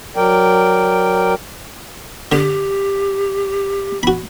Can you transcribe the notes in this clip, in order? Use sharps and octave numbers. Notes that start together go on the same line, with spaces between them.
F#3 A#4 D5 G5
D3 G4
F#4 B5